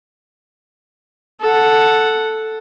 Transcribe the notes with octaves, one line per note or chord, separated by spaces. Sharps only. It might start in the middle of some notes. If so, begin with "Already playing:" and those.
A4 F#5